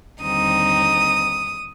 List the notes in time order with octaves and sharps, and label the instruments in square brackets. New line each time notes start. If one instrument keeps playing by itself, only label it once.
[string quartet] D#2 D3 G3 C4 D#4 D#6